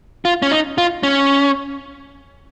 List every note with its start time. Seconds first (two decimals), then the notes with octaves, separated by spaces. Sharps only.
0.25 F4
0.42 C#4
0.51 D#4
0.78 F4
1.03 C#4